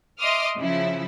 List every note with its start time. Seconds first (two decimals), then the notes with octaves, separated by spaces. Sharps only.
0.19 D#5 E5 C6 D6 D#6 F6
0.56 C#3 F3 E4